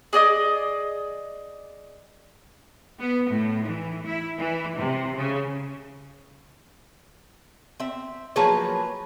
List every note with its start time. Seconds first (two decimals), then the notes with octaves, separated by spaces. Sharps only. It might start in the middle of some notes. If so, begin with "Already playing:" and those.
0.13 G#4 D5 D#5 D#6
3.00 B3
3.30 A2
3.64 E3
4.05 E4
4.38 E3
4.77 C3
5.16 C#3
7.80 C4 E5
8.36 F3 F#3 A#3 G#4 B4 C#5